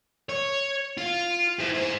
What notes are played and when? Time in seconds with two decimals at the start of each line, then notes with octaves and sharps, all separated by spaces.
0.29 C#5
0.98 F4
1.60 E4 C5
1.74 G#4 C5